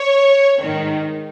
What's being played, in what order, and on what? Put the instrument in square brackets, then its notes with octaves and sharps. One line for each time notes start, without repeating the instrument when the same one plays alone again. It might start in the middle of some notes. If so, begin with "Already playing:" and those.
Already playing: [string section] C#5
G#2 D#3